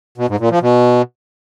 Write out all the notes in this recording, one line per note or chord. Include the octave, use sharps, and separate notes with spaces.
B2
G#2
A#2
F3
B2